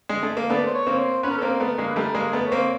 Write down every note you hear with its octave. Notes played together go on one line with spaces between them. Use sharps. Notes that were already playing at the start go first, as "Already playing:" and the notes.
G#3
A3
A#3
A3 B3 D5
C5
C#5
A#3 C4
C5
B3 C#4 B4
A#4
A4
A#3 C4 A#4
A3 B3
G#3 A#3
B4
G3 A3 A#4
G#3 A#3
A#4
A3 B3
C#5
A#3 C4